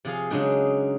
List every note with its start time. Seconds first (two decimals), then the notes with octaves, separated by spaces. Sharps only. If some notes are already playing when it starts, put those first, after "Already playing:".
0.05 C3 F3 G#4 F5
0.30 C#3 F#3 G#3 D4 D#4